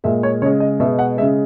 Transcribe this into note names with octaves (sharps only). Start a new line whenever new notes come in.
A#2 G#3 E5
C#5
C#3 G#3 C#5
D#5
B2 G#3 E5
F#5
C#3 G#3 E5